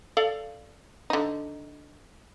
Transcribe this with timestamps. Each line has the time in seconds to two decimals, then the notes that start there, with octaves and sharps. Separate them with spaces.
0.17 A4 D5 F5
1.10 D3 D#4